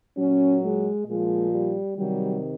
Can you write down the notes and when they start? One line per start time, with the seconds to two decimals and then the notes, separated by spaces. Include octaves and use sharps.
0.16 A#2 F#3 C#4
0.61 G#3
1.06 A#2 F3 G#3
1.51 G3
1.96 C3 D#3 F#3 G3